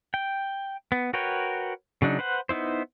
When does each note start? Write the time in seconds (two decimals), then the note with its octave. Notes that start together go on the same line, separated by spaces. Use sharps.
0.14 G5
0.92 B3
1.14 F#4 A#4 B4 C#5 G5
2.02 C#3 F#3 D4 D#4
2.19 B4 C5 F#5
2.49 B3 D#4 E4 C5